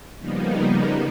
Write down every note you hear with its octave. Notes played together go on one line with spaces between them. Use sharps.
C#3 F3 G3 A#3 B3 D#4